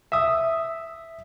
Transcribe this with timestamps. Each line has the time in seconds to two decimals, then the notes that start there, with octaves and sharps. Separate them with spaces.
0.12 E5 D#6